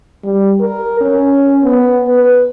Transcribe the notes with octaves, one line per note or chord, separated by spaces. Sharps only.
G3
A#4
C#4
B3
B4